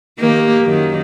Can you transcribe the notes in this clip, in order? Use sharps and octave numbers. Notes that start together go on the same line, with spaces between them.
D#3 A#3 G4
F#2 D#3